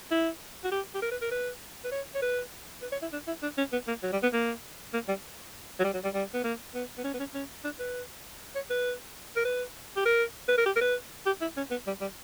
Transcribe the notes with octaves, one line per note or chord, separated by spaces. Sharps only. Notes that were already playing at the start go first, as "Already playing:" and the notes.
E4
F#4
G4
G4
A#4
B4
A#4
B4
B4
C#5
C#5
B4
B4
C#5
E4
D4
E4
D4
C#4
B3
A#3
F#3
G3
B3
A#3
A#3
G3
F#3
G3
F#3
G3
G3
B3
A#3
B3
B3
C#4
B3
C#4
C#4
D4
B4
C#5
B4
A#4
B4
G4
A#4
B4
A#4
G4
A#4
B4
G4
E4
C#4
B3
G3
G3